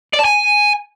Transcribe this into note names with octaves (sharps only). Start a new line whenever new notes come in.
D5
A5
G#5